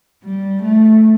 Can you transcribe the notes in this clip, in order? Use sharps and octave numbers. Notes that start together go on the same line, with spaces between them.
G3
A3